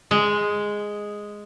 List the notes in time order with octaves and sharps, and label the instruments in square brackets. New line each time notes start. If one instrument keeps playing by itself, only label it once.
[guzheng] G#3